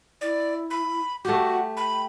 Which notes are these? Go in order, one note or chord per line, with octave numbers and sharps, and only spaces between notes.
E4 D5
B5
A3 F#4 G4 F#5
G5 B5